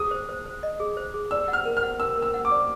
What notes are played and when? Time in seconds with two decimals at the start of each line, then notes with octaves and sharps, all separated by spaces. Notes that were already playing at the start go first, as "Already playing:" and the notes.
Already playing: G#4 D#6
0.11 C5
0.29 C5
0.46 C5
0.63 D#5
0.80 G#4
0.97 C5
1.14 G#4
1.31 D5 E6
1.48 F#5
1.53 F6
1.65 A#4
1.77 F6
1.83 F#5
2.00 A#4 E6
2.17 A#4
2.22 E6
2.34 F#5
2.45 D6
2.51 D5